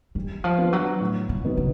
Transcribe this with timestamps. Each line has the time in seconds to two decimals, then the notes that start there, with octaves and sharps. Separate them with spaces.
0.15 E3 G3
0.44 F3
0.58 B3 D4 F4
0.73 F#3
1.01 A2
1.29 D3
1.44 F#3 B3 D#4
1.57 C#3